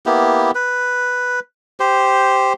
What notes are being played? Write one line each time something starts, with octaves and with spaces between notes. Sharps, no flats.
A#3 B3 E4 G4
B4
G4 C5